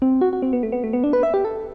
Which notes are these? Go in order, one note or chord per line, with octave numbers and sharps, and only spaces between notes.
C4
F#4
F#4
C4
B3
A3
B3
A3
B3
D4
B4
E5
G4
A4